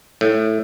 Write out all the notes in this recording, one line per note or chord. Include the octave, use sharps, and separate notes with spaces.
A2